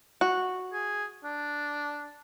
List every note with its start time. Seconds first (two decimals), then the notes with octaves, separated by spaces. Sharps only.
0.21 F#4
0.73 G#4
1.24 D4